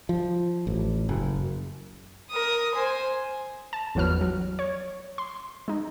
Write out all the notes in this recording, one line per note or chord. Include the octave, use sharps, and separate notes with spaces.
F3
A1
F#1
A#4 D#6
C5 G#5
A5
G#1 E2 F3 F#3 B4 F6
F#3
C#5
C6
G#3 D#4